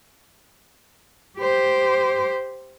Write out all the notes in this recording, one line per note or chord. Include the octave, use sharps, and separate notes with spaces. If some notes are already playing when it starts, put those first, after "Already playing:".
G4 C5